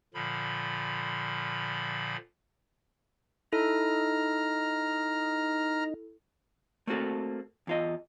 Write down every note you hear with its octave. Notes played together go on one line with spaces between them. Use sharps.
A#2 D3 F3 B5
D#4 E4 A4 A#5 F6
A3 A#3 C4 F#4 A4
E2 F4 D#5